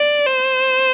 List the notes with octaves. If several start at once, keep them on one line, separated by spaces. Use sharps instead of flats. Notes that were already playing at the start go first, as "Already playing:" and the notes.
Already playing: D5
C5